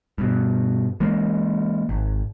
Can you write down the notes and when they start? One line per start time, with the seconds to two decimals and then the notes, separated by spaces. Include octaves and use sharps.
0.18 G2 B2
1.00 E3 G#3 A#3
1.89 G#1